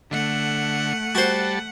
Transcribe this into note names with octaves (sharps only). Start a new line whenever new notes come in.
D3 A3 F#5
G3 F#4 C5 A5